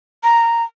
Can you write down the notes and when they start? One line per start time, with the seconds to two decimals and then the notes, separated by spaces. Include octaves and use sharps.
0.23 A#5